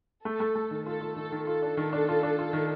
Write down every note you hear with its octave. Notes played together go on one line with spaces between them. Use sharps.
A3 A4
A3
A3
D#3
F4 A4
F4
D#3 A4
D#3
F4 A4
D4
D#3
D4
F4
D4
F4
D#3